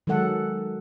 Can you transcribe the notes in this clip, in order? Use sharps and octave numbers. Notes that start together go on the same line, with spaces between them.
D#3 F#3 G#3 A4 F#5